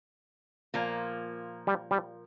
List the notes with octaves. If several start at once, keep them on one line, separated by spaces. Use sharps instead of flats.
A#2 F3 A#3
G3
G3